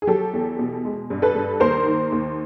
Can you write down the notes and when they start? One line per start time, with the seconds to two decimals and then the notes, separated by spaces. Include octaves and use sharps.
0.02 G#4
0.07 F#3 G4 A4
0.33 E2
0.59 B2
0.85 G#3
1.10 G2
1.22 A4 B4
1.35 G2
1.60 D#2 A#4 C5
1.86 D#3
2.12 D#2